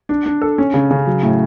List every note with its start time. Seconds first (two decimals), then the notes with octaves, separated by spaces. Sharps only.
0.09 D4
0.26 D4
0.42 A4
0.58 C#4
0.74 C#3
0.91 C#3
1.07 F#3
1.23 A2